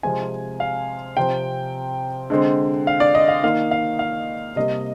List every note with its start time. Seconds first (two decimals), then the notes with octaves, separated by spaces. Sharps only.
0.03 C3 F3 G#3 C4 G#5
0.60 F5
1.17 C3 F3 C4 G5
2.30 D3 G#3 C4
2.87 F5
3.00 D5
3.15 D#5
3.28 F5
3.43 D#3 A#3 F5
3.71 F5
3.99 F5
4.56 C3 G3 A#3 D#5